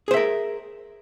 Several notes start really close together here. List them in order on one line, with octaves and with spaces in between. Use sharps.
G#4 C5 E5 A#4